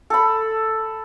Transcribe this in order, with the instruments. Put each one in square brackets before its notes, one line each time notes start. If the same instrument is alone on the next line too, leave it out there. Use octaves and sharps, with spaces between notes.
[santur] A4 B5